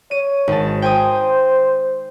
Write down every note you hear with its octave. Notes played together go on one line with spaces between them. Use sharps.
C#5 D#7
G#1 A5
C5 G5 G#5 D#6